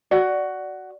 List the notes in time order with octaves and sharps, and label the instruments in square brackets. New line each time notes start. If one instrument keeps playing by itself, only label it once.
[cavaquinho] F#4 [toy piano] D5